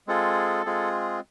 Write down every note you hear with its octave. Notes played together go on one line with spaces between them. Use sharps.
G#3 C4 F4 G#4 A4
G#3 C4 F4 G#4